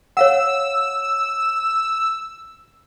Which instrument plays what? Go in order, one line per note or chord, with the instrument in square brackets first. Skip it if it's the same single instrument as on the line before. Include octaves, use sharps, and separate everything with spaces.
[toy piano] C#5 F5 F#5 [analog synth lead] E6